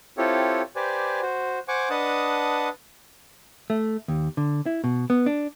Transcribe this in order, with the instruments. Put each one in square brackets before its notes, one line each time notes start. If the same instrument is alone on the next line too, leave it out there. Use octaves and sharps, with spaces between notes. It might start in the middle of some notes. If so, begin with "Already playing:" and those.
[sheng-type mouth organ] C4 E4 F4 G4 A4 C#5
G4 B4 C5 D5 G#5
F#4 C5
C5 F#5 G#5 C#6 D6
D4 B4 D#5 F#5 A5 D#6
[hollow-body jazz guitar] A3
D#2
D3
E4
B2
B3
D4